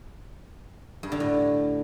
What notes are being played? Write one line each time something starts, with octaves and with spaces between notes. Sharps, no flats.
G2
D3
A2